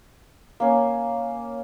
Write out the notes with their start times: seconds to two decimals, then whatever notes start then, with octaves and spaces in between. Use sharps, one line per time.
0.60 A#3 C#4